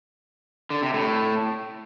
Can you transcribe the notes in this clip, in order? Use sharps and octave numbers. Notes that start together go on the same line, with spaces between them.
D3
C3
A2